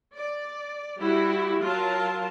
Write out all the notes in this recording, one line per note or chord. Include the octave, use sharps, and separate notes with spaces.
D5
G3 E4 F#4 G4
F#3 F4 A#4 A5